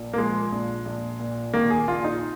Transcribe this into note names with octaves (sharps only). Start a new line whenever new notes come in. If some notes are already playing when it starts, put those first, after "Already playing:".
Already playing: A#1 A#2
A#3
F3 G#3
A#1
A#1
A#2
D#3 A#3
G#4
A#1 F4
D#4